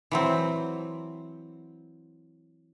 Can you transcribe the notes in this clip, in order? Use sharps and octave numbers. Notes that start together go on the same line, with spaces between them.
E3 F#3 C4